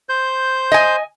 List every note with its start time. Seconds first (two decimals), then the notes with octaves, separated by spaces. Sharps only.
0.09 C5 G6
0.72 D#5 G#5